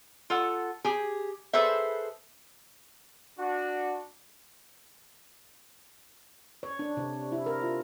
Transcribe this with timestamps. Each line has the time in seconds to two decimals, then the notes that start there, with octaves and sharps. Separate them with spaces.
0.30 F4 A4 F#5
0.84 G4 G#4 G#5
1.53 G#4 A4 B4 C5 E5
3.38 D4 F#4
6.63 C#5
6.79 D4
6.97 C3
7.32 E4
7.46 A#4
7.63 F4